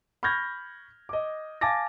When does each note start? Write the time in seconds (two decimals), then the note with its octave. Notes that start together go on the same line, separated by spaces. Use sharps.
0.23 B5 C#6 F6 G6 G#6 A#6
1.09 D#5 D6
1.61 F5 G#5 A5 D6 A6 A#6